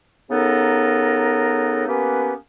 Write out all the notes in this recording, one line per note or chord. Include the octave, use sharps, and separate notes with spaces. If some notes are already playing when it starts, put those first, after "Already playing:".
C#3 B3 D#4 A4 A#4
A#3 B3 C#4 G4 B4